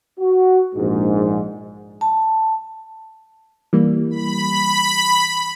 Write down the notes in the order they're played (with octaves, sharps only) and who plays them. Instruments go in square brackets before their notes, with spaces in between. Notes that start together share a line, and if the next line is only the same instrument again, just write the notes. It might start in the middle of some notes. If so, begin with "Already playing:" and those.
[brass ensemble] F#4
A#1 G#2
[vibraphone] A5
[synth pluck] E3 G3 A#3
[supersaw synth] B5